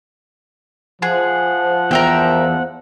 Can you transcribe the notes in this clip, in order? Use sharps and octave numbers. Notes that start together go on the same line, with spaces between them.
F3 G#4 F#5
E2 A#4 E5 G5